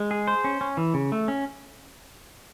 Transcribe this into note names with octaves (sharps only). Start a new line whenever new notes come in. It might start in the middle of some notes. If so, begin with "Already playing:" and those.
Already playing: G#3
G#4
C5
C#4
C#4
E3
C#3
A3
C#4